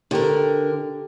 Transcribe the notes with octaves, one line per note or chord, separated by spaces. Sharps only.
D3 G4 A4 A#4 G5